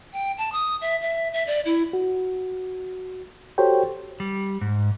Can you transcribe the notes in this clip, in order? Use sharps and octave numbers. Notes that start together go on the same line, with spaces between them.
G5
A5
D#6
E5
E5
E5
D5
E4
F#4
F#4 G4 A4 C5 C#5 G5
G3
G#2